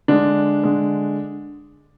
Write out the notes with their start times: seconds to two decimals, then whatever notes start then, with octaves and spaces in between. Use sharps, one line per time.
0.08 D3 G#3 D4
0.63 D3 G#3